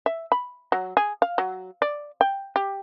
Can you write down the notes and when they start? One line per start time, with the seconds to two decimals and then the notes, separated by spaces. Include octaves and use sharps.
0.06 E5
0.32 B5
0.72 F#3
0.97 G#4
1.22 F5
1.38 F#3
1.82 D5
2.21 G5
2.56 G4